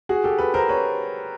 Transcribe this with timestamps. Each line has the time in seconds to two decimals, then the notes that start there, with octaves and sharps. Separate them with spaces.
0.09 F#4 G#4
0.24 G4 A4
0.38 A4 B4
0.54 A#4 C5
0.69 B4 C#5